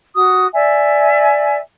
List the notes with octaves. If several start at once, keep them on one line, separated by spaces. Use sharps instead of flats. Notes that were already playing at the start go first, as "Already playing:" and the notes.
F#4 D#6
D5 E5 G#5